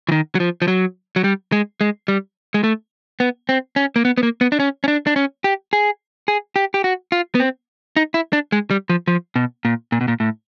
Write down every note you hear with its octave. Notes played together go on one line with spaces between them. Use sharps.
E3
D#3
F#3
F3
F3
F#3
F#3
G3
G#3
G#3
G3
G#3
A3
B3
C4
C#4
A#3
B3
B3
A#3
B3
D4
C#4
C#4
D4
D4
C#4
G4
G#4
G#4
G4
G4
F#4
F4
B3
C4
D#4
E4
D4
G#3
G3
F3
F3
B2
A#2
A#2
B2
A#2
A2